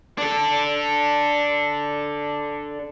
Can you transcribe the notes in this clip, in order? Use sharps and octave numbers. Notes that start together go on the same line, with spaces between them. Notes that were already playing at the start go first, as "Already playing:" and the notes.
D4 A4